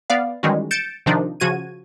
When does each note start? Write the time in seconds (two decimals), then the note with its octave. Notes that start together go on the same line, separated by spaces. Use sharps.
0.10 B3 D5 F5
0.43 D#3 E3 G3 G#3 C#4 F#4
0.71 G6 A6 C#7 D7 E7
1.06 C3 D#3 F3 D4 D#4
1.40 C#3 F3 F#4 G#6 D#7